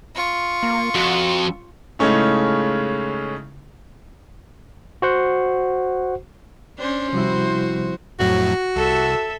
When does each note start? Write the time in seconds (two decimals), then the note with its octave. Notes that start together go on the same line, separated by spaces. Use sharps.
0.15 F4 C#6
0.63 A#3
0.95 F2 F#4
1.99 A2 C#3 G#3 A3 C#4 D#4
5.02 F#4 C5 F#5
6.78 C#4 D4 C5
7.12 C3 F3 G3 C4 E4 F#4
8.20 F2 A2 F#3 F#4
8.76 C2 A4 E5